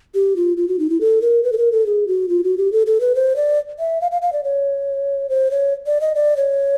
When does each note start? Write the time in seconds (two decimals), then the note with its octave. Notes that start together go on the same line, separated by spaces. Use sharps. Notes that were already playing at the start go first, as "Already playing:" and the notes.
0.14 G4
0.36 F4
0.57 F4
0.68 F#4
0.79 D#4
0.90 E4
1.01 A4
1.22 A#4
1.43 B4
1.52 A4
1.58 A#4
1.72 A4
1.86 G#4
2.07 F#4
2.29 F4
2.44 F#4
2.58 G4
2.72 A4
2.87 A4
3.00 B4
3.15 C5
3.36 D5
3.79 E5
4.01 F5
4.12 F5
4.22 F5
4.33 D5
4.44 C#5
5.29 C5
5.51 C#5
5.86 D5
6.01 D#5
6.15 D5
6.37 C#5